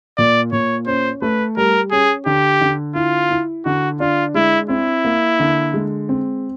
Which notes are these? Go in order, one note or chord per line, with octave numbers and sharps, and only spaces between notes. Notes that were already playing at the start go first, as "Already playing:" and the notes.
A#2 D5
A#2 C#5
C#4 C5
A3 B4
G3 A#4
C#4 G#4
D3 G4
D3
E4 F4
E4
D3 F#4
D4 F4
G#3 E4
C4 E4
A#3
D3
G#3
C4